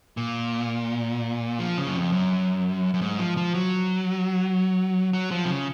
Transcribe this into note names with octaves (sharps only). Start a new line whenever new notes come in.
A#2
F3
C#3
F#2
F2
F#2
F#2
G#2
F3
F3
F#3
F#3
F3
C3
C#3